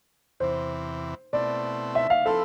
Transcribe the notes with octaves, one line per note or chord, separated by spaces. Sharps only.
E2 C3 E3 C5
B2 A3 C4 E4 D5
E5
F5
F3 C4 E4 A4 B4